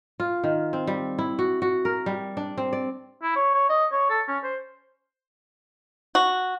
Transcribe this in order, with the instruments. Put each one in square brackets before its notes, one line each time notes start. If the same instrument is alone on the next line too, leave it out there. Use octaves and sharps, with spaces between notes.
[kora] F4
D#3
C4
G3
E4
F#4
F#4
A#4
G3
D4
C4
D5
[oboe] E4
C#5
C#5
D#5
C#5
A4
C#4
C5
[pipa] F#4